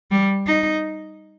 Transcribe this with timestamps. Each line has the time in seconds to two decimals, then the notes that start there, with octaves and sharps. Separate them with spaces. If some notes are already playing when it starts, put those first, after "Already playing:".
0.11 G3
0.47 D#4